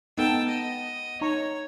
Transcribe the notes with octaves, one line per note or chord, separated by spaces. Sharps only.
B3 D#4 A4 G5 A5 E6
D#5
D#4 C#5 A#5 C#6